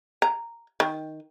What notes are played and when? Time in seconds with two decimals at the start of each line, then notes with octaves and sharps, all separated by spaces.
0.22 A#5
0.80 D#3